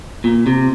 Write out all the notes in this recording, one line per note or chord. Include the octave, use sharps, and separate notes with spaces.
A#2
C3